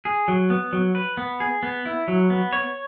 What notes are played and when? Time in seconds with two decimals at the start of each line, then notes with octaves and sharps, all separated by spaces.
0.05 G#4
0.28 F#3
0.50 B3
0.73 F#3
0.95 B4
1.17 B3
1.40 G#4
1.63 B3
1.85 E4
2.08 F#3
2.30 B3
2.53 C#5